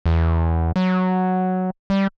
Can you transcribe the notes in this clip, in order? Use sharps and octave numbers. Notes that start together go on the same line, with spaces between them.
E2
F#3
G3